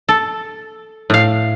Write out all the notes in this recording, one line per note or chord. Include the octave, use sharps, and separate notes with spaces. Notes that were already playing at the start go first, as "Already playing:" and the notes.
A4
A2 F5